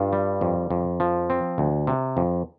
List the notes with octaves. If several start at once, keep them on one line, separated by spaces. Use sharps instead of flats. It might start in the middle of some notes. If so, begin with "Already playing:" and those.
Already playing: G2 F4
G3
F2
F2
F3
C4
D2
C3
F2